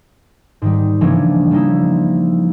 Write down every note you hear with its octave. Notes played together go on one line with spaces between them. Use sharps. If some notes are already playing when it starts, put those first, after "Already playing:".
G#2 D#3 G3
C#3 E3 F3 A#3 C#4 D4
F3 G3 A#3 D#4 E4